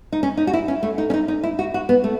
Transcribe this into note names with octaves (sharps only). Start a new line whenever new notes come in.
D#4
C#4
D#4
F#4
E4
C#4
A3
D#4
C#4
D#4
D#4
E4
F#4
F#4
B3
A3